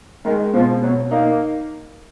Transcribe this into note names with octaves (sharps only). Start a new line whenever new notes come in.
D#3 G#3
B2 F3
B2 F#3
A#3 D#4